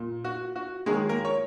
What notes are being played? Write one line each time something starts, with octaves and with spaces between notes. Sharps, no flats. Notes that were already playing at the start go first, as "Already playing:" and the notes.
Already playing: A#2
F#4
F#4
D#3 F#3 G#3 A#3 G#4
A#3 A#4
C#5